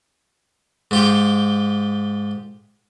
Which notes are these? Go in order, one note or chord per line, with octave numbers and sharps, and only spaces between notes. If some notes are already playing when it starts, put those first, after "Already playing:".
G#2 F4 G4